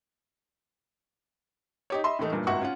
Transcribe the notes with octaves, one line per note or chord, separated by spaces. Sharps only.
D#4 G4 C#5
D#5 E5 B5 C6
A2 E3 A3 D#4
F#1 G2 A#2
G#1 C#2 F#4 E5 F#5 C#6
C#4 F4 F#5